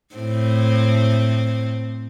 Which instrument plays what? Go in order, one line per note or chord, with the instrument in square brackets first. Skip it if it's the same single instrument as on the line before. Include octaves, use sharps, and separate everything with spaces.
[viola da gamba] A2 C4